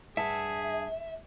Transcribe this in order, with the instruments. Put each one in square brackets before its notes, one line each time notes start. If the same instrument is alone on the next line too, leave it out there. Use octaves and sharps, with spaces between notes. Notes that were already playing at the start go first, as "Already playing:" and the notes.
[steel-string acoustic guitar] G2 F#5 A5 [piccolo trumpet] G#4 [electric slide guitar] E5